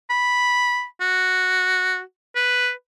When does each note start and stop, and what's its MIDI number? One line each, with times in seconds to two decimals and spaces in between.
0.10 0.84 83
1.01 2.00 66
2.36 2.71 71